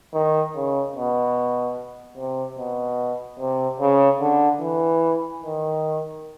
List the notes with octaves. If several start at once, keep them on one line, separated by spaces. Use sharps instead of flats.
D#3
C#3
B2
C3
B2
C3
C#3
D3
E3
D#3